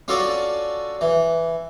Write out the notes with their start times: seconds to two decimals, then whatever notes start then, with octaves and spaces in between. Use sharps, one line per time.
0.08 C#4 F4 F#4 A4 D5
1.01 E3